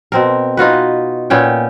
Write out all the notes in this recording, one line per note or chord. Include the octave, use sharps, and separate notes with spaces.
B2 C4 A#4
D#4 F4 F#4 B4
A#2 B3 C#4 G5